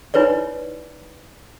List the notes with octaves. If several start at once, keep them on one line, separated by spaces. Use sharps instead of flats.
D#4 E4 B4 C#5 D5